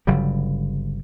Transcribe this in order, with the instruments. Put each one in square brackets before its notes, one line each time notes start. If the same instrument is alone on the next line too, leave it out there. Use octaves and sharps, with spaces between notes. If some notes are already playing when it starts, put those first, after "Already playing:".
[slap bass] G1 C#3 F#3 G3